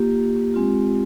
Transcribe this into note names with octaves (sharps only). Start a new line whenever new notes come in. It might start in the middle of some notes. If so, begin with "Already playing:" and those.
Already playing: A#3 F4 G4
G#3 C4 F4